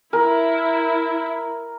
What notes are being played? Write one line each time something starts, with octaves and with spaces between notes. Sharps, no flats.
E4 A#4